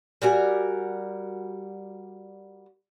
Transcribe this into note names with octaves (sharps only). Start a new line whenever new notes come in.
G3 F#4 A#4 G#5